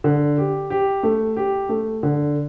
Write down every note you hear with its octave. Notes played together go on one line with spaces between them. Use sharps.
D3
G4
G4
A3
G4
A3
D3